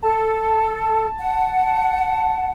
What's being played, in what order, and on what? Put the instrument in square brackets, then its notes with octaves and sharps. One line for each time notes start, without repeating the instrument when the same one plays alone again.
[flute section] A4 [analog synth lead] A5
[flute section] F#5